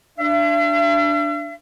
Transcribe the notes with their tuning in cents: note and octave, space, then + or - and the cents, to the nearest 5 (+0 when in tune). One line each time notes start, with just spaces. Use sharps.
D4 +0 E5 +45